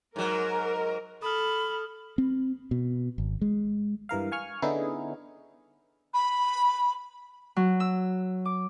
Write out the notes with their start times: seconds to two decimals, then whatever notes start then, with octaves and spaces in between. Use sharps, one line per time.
0.16 G#2 F#3 A#4
1.22 A4 B5 D#6 F6
2.18 C4
2.71 B2
3.18 G#1
3.41 G#3
4.09 G2 E3 A#4 F5
4.32 F5 G#5 C#6 F6
4.62 D3 B3 C#4 D#4 E4 G#4
6.14 B5
7.56 F#3
7.80 E6
8.45 D6